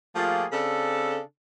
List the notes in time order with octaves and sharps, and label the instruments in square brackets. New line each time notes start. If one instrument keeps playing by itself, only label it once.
[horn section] F3 A3 A#3 F4 G4 G#4
C#3 C4 D4 A4